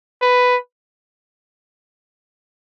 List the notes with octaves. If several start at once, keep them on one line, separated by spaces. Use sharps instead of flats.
B4